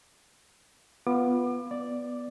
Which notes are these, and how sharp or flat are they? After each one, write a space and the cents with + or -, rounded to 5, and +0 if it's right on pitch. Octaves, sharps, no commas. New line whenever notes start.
B3 +0 F4 +0 D6 +35
B3 +0 D5 +0